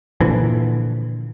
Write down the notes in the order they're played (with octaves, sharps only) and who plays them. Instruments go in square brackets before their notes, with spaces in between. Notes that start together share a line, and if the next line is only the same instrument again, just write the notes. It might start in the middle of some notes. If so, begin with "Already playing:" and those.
[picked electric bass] A#2 D3 E3 F3